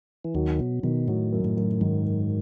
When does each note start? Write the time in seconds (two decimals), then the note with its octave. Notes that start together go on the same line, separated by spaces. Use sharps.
0.25 E3
0.35 D#2 D#3 F#3
0.59 B2 F#3
0.83 B2 D#3
1.08 A2 F#3
1.32 F#2
1.45 A2
1.57 F#2
1.81 G#2 D#3
2.06 F#2